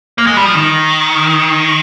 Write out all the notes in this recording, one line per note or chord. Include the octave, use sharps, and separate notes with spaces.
A#3
G#3
G3
F3
D#3